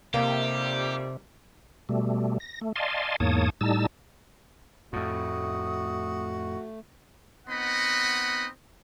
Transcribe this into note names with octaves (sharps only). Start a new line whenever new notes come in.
F2 C3 D#3 G3 A#3 G4
B2 G3 A3
A#6
A3
D5 D#5 F5 G#5 A5 C6
E2 G#2 A#3 C#5 A5 D#6
A2 G3 D#4 A5 E6
F2 A2 A3 F#4 D#6
B3 C4 D#4 D#5 F#5 B5